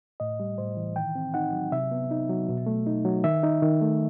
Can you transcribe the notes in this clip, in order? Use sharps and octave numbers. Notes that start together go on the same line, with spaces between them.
A2 D#5
G3
A2 C5
E3
D#3 G5
C4
D#4 F#5
F#3
C3 E5
B3
D#4
F#3
B2
A3
D#4
F#3
D#3 E5
D#4
D#3
A3